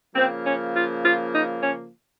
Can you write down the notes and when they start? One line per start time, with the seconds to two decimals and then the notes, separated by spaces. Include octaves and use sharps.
0.15 C#3 F3 A#3 C4
0.45 C#4
0.74 F4
1.03 F4
1.32 D#4
1.61 C#4